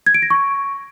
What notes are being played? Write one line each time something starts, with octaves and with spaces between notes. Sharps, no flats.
G#6
D7
A#6
C#6